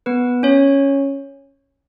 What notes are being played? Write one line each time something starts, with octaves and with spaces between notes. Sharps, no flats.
B3 B4
C#4 C#5